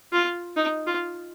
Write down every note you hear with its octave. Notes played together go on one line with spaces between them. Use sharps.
F4
D#4
F4